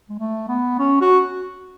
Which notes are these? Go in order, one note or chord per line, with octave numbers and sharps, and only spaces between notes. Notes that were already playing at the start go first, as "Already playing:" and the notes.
G#3
A3
B3
C#4
F#4